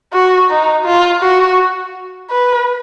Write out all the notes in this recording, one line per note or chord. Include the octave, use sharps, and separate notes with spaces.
F#4
D#4
F4
F#4
B4